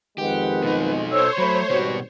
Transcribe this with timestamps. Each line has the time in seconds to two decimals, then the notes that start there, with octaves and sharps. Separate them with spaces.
0.18 F2 D#3 G#3 G4 B4 F#5
0.63 B2 D#4
1.09 A4 C5 C#5 E6
1.38 F#3 A3 B5
1.70 G#1 B2 G3 F#4 B4